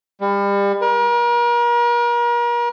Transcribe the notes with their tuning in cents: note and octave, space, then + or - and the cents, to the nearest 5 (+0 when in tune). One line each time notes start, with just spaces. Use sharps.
G3 +35
A#4 +40